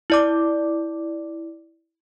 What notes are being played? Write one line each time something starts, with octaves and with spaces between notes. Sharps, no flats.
E4 D5 D6